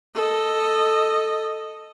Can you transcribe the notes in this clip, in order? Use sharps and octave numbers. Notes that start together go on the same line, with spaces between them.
A4 D#5